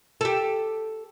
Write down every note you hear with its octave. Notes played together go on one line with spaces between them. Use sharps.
G4 A4